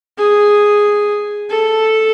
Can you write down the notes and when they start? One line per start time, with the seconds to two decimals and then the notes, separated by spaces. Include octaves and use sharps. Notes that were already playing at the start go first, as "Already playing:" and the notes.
0.18 G#4
1.50 A4